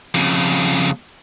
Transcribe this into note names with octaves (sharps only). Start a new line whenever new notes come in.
F2 C#3